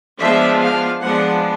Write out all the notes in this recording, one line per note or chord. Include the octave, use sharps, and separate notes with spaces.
F3 G#3 B3 D4 E5
F5
F3 G#3 B3 D4 F#5